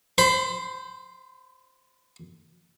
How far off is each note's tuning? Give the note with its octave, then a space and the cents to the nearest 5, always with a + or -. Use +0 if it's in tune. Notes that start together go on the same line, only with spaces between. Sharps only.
C5 +0 B5 +40